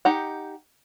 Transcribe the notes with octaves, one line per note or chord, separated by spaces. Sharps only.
D#4 G4 F#5